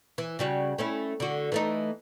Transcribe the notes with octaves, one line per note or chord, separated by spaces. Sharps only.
E3
C#3 G3 F#4
A3 C#4 E4
D3 F#4
E3 A3 D#4